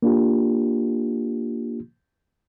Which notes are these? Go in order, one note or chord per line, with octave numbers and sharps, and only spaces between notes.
A#3 D4 F4 G4